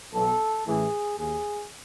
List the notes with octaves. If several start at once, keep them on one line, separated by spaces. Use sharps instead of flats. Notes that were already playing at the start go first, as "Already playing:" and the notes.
B1 B2 A4
A1 A2 E3 G#4
D#2 D#3 G#4